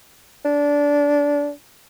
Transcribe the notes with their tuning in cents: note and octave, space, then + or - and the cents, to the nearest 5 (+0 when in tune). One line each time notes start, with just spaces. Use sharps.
D4 -20